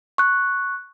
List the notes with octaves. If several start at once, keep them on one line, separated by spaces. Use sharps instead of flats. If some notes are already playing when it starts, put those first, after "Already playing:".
C#6 F#6